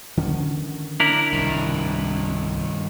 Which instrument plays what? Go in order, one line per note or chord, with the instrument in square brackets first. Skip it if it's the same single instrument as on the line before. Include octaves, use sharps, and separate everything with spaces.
[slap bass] D3 D#3 C#4
[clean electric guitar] D4 E4 A#4
[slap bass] C2 [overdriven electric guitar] G2 D#3